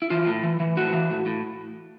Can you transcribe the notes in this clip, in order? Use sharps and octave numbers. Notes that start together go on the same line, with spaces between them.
E4
E3 F4
A2
E3
E3
A2 F#4
E3
A2
A2